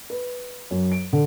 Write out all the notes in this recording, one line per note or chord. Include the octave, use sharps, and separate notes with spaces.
B4
F#2
D7
D3